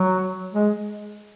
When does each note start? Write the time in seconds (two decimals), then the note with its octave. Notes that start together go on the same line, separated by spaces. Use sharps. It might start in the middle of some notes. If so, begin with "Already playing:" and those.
Already playing: F#3
0.53 G#3